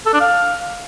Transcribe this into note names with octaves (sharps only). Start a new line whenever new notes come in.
A4
D4
F5